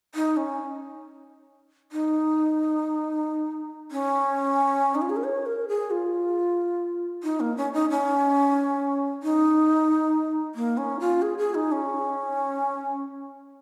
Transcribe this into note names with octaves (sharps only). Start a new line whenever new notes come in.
D#4
C#4
D#4
C#4
D#4
F4
G#4
A#4
C#5
A#4
G#4
F4
D#4
A#3
C#4
D#4
C#4
D#4
A#3
C#4
F4
G#4
G#4
D#4
C#4